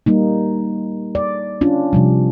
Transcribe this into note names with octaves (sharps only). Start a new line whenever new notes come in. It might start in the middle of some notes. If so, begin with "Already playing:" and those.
G3 A#3 D#4
D5
C#4 D4 F4
C3 F3 G3